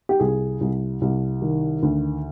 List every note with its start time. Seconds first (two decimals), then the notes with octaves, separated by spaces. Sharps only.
0.09 G4
0.20 C2 G#4
0.61 C2
1.02 C2
1.42 D#3
1.83 D2